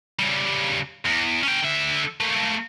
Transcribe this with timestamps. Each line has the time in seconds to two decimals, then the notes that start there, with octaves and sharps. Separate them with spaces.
0.19 C#3 G3
1.06 E2
1.44 C#4 G5
1.62 D3 E5
2.20 A3 A#3